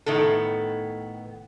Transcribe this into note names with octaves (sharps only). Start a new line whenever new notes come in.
A2 D#3 B3 A4